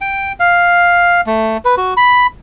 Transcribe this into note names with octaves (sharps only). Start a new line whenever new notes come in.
G5
F5
A3
B4
F#4
B5